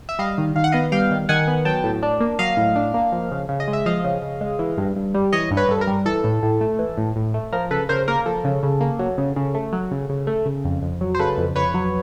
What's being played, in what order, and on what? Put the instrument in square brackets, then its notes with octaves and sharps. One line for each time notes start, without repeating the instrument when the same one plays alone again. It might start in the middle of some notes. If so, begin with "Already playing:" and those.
[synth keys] E5
G3 D#5 F5
D#3
D#3 F5
F#5
B3 D#5 F5
G3 F5 G5
D#3
D#3 F#5 G#5
B3
F#3 G5 A5
A2
D4
A#3
F#3 D#5 F5
A2
D4
A#3
F3
C#3
C#3
D#5
G#3
E5
F3 D#5 F5
C#3
C#3
G#3
E3
G2
G2
G3
E3 C#5 D#5
G2
B4 C#5
G2 A4
A#4
G3
E3 A4
A2
A2
A3
E3
A2
A2
A3
F3 A#4
C#3 A4 B4
C#3 A#4 C5
A#3 A#4
F3 A4
C#3
C#3
A#3
F#3
C#3
C#3
A3
F#3
C#3
C#3
A3
C#3
F2
F2
F#3
C5
C#3 A4 B4
F2
F2 B4 C#5
F#3